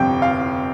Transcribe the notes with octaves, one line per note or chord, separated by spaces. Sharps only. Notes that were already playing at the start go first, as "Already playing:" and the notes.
Already playing: G1 F2 C3 G5
F5